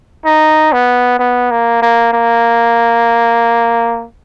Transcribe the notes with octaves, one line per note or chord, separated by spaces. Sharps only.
D#4
B3
B3
A#3
A#3
A#3